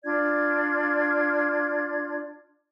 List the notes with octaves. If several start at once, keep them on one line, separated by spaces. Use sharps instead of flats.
D4 F4 D5 G#6